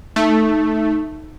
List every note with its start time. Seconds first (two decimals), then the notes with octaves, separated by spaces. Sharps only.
0.16 A3 D#4